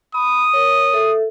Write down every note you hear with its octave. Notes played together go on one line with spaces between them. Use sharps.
B5 D#6
A#4 C#5
A4 E5